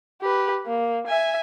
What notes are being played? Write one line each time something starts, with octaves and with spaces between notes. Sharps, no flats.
G4 B4
A#3
E5 G#5